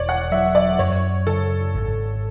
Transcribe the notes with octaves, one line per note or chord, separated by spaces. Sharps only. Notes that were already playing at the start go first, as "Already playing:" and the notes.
Already playing: E1 C#5 D5
F#5
F#3 E5
D5
F#2 C#5
C#3 A4
G#1